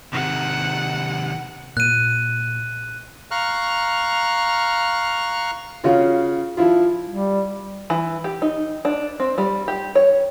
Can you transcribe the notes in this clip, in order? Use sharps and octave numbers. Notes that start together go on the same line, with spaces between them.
C3 D#3 F#5
A#2 F#6 D#7
F5 A#5 C#6 F6 F#6
C#3 C#4 F4 F#4
F3 E4 F4
G3
E3
G4
D#4
D4
C4
G3
G4
C#5